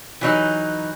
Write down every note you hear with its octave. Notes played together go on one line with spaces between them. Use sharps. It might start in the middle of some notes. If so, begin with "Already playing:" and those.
E3 F#3 D#4